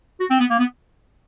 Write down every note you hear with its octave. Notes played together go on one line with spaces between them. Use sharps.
F#4
C4
B3
A#3
B3